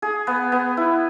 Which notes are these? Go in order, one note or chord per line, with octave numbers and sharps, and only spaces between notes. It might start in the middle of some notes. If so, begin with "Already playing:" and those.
G#4
B3
B3
E4